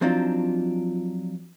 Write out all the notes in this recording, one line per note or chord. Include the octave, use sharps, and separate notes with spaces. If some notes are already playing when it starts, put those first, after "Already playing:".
F3 F#3 C4 D4 D#4 F4